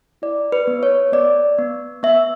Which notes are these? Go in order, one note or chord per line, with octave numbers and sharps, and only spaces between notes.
E4 D5
B4
B3
C#5
B3 D5
B3
B3 E5